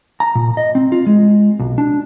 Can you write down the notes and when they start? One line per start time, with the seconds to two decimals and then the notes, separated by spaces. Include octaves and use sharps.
0.20 A#5
0.35 A#2
0.57 D#5
0.75 C4
0.92 F4
1.07 G#3
1.59 B1
1.78 D4